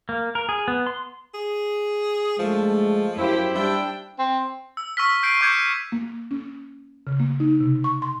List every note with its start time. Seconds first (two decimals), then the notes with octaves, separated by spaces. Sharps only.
0.09 A#3
0.35 A#4
0.49 G#4
0.68 B3
0.87 C6
1.34 G#4
2.39 G2 F3 G#3 A3
3.17 F#2 E4 G4 C5 G5
3.55 G3 D4 E4 G5
4.19 C4
4.77 E6
4.97 C#6 E6 F6 B6
5.23 G6 C7 D7 D#7
5.41 C#6 D6 G6 G#6 C#7 D#7
5.92 A#3
6.31 C#4
7.07 C#3
7.20 A#3
7.40 D#4
7.60 C3
7.84 C#6
8.02 C6